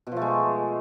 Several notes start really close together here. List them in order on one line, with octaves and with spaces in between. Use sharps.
B2 F3 A3 G#3